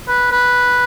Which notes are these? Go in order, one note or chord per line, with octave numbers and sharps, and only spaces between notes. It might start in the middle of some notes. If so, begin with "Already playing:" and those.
B4
B4